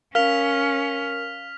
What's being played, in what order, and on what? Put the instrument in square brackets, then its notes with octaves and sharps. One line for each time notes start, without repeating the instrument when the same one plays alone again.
[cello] C#4 [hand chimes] A#4 [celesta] F5 [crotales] F6 B6 F7